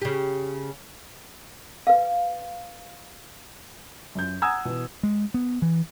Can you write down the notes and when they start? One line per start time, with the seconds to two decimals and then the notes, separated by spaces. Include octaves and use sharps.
0.02 C#3 G4
1.87 B4 F5
4.15 F#2 G6
4.42 F#5 G#5 A#5 D#6 E6 G#6
4.65 B2 E3
5.03 G#3
5.34 B3
5.62 E3